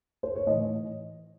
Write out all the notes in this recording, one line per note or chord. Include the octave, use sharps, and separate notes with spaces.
C5
C#5
A2 E3 D#5